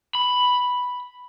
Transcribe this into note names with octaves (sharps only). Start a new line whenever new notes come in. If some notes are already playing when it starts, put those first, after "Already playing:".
B5